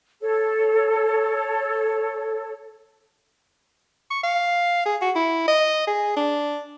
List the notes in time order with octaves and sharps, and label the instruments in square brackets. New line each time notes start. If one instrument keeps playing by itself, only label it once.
[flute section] A4 C#5
[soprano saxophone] C#6
F5
G#4
F#4
E4
D#5
G#4
D4